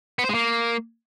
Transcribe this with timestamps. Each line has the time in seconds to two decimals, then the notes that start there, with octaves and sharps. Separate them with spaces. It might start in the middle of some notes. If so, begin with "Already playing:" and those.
0.19 B3
0.24 C5
0.29 G#3
0.34 A#3